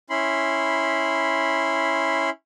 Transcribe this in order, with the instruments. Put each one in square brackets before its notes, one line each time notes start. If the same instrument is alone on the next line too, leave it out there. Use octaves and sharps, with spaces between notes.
[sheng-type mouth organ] C#4 E4 B5 C6